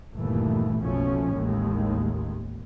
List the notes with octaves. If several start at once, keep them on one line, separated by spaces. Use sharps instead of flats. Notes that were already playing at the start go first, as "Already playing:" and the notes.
G1 D#2 A#2 E3 A3
F#1 B1 B2 F3 A3 C#4
A1 D#2 A2 D#3 G#3